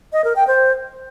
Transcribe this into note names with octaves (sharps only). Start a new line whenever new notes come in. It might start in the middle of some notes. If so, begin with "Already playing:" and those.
D#5
A#4
G5
C5